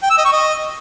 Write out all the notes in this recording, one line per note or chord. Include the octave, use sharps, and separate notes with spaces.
G5
E6
D#5
C#6
D#5